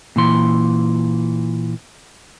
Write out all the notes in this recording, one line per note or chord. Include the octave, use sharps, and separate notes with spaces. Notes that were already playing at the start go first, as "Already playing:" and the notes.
A#2 E3 C6